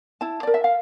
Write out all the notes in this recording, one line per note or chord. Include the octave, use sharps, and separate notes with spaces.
E4 A5
A#4 D5
E5
F5